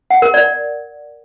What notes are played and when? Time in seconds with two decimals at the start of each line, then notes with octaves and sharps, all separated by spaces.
0.10 F#5
0.22 A#4
0.34 D5